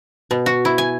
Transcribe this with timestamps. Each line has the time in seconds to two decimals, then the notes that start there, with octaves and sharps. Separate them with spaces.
0.31 B2
0.46 F#4
0.65 E4
0.78 G#5